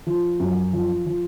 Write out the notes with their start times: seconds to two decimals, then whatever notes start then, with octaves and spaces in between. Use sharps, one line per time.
0.07 F3
0.40 F#2
0.73 F3
1.06 F3